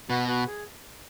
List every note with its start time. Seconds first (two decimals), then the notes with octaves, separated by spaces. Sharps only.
0.10 B2 F#4 B4
0.28 F#4 B4
0.47 G#4